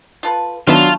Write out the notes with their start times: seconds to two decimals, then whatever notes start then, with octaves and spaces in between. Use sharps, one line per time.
0.23 F4 A4 B4
0.67 D3 D#3 F#3 A3 B3 D4 F4 E5